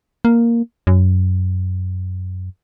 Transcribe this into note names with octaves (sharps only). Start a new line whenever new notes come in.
A#3
F#2